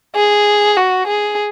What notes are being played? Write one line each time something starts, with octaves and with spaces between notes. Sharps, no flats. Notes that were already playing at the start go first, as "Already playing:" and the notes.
G#4
F#4
G#4